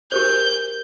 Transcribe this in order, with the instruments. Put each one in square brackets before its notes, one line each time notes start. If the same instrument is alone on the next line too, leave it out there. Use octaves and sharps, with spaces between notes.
[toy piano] G4 A#4 C5 [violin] G6